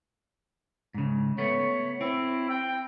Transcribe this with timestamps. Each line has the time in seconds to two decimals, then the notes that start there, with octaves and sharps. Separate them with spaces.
0.94 G#2 C#3
1.38 A3 B3 C#5
2.01 C4 E4
2.50 G5